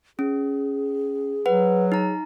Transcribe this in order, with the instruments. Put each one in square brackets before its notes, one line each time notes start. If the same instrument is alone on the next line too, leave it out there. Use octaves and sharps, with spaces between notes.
[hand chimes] C#4 [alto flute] G#4
[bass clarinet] F#3 [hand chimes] B4 F#5
[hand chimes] D#4 A#5